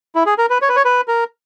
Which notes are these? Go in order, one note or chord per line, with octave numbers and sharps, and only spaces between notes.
E4
G#4
A#4
B4
C#5
B4
C#5
B4
A#4